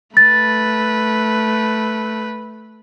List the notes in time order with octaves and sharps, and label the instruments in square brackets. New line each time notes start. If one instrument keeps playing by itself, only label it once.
[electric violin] A3 B4 [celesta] A6